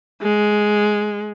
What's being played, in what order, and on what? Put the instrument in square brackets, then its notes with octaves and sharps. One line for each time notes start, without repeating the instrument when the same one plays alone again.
[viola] G#3